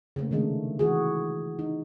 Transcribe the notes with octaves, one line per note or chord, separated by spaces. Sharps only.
C#3 A3 A#3
C3 D#3 G#3 A3 D4
E3 F#4 G#4
D#4